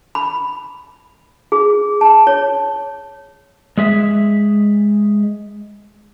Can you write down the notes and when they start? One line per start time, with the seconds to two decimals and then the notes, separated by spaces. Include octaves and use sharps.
0.15 B5
1.52 G#4
2.01 A5
2.27 C#5
3.77 G#3 G#4 E5